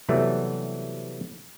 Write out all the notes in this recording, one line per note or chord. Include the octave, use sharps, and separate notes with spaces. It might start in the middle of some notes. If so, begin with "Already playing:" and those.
C3 E3 F#3 G3 A3 B3